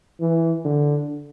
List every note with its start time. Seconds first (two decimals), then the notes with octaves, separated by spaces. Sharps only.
0.20 E3
0.65 D3